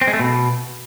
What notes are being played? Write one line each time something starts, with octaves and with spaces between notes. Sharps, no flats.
C4
G#3
A3
B2